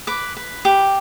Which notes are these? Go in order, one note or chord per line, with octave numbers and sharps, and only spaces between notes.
B4 D6
B4
G4